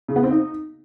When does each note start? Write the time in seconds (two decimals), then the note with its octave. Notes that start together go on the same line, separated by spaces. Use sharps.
0.08 C#3
0.16 B3
0.23 C4
0.31 D#4